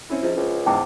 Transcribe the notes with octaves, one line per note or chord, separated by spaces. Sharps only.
C4 C#4 E4
G#2 F3
C#2
E2 G#2 G5 A5 D6